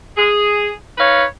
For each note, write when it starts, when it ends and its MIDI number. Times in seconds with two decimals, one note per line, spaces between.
0.16 0.70 68
0.98 1.23 63
0.98 1.23 71
0.98 1.23 73
0.98 1.23 77